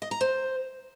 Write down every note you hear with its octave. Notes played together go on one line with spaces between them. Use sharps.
D#5
A#5
C5